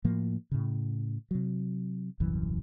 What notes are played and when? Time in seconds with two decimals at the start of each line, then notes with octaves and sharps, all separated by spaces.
0.04 A2 F3 A#3
0.51 A2 C#3
1.31 C3 F#3
2.20 D#1 C2 F#2 E3